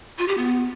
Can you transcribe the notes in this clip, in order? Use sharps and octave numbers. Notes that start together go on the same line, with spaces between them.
F4
G4
B3